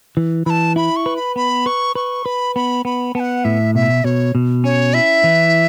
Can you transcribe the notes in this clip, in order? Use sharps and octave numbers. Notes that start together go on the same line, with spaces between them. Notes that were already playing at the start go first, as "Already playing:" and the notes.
E3
E3 A5 B5
E4 B5
C#6
B4
B5
B3 B5
B4 C#6
B4 C#6
B4 B5
B3 B5
B3 B5
B3 F#5 A5
A2 E5
B2 E5
B2 C#5
B2
C#4 C#5
E4 E5
E3